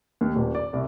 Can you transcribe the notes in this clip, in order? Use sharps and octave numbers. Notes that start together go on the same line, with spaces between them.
D#2
D#1
D5
C2